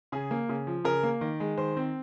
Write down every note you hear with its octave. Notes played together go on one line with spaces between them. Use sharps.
C#3 G#4
A#3
C#3
F3
C#3 A#4
A#3
D#3
G#3
D#3 C5
C4